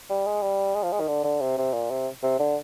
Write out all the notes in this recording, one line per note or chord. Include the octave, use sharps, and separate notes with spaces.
G3
G#3
G3
G#3
F3
G#3
D#3
D3
D3
C3
C3
A#2
C3
C3
D3